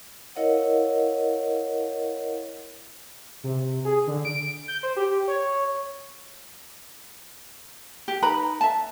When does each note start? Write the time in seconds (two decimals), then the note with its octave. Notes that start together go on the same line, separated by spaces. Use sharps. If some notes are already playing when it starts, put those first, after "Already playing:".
0.35 E4 A#4 C#5 D#5 F5 F#5
3.44 C3
3.85 G#4
4.07 D3
4.25 D7
4.68 G6
4.83 C5
4.97 G4
5.28 C#5
8.08 G4
8.22 D#4 B4 A#5 B5
8.61 E5 A5